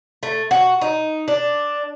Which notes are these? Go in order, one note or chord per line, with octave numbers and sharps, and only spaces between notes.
A3
F#4
D#4
D4